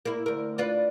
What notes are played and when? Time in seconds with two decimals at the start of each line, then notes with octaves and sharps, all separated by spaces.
0.05 A#3 E4
0.26 D2 A#4
0.58 D4 F4 B4